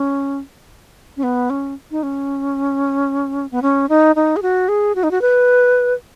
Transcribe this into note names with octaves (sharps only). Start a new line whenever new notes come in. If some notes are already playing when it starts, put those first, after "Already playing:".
Already playing: C#4
C#4
B3
C#4
D#4
C#4
B3
C#4
D#4
D#4
G#4
F#4
G#4
F#4
D#4
F#4
B4